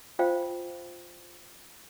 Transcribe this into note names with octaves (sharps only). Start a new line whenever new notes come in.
F4 C5 F5 G5